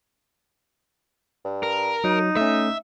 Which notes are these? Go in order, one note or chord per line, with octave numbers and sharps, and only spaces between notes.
G2
A#4
F#3 D#4
A3 C#4 E5